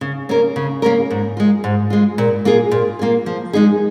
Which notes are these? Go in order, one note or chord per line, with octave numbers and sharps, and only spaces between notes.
C#3
A#3 C#4 A#4
C#3
A#3 C#4 A#4
G#2
G#3 F4
G#2
G#3 F4
A#2
A#3 F4 G#4
A#2
A#3 F4 G#4
F3
G#3 D#4 G#4